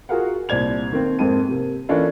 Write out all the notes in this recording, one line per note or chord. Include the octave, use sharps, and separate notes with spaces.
F4 F#4 G#4 A#4 F5 F#5
C2 A#2 C5 D5 G#6 F7
D#3 A#3 C4
F2 G#2 A#3 C4 A5 D#7
C3 A#3
E3 A#3 C#4 D4 F4 A4